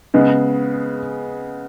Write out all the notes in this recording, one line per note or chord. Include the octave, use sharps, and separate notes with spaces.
C#3 G#3 B3